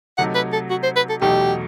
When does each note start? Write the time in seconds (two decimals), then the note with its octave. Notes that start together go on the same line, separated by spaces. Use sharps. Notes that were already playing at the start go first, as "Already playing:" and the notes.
0.18 C3 F#3 A3 D#4 F#5
0.35 B4
0.53 A4
0.70 F#4
0.83 C5
0.96 B4
1.09 A4
1.22 E2 B2 F#3 A3 D#4 G4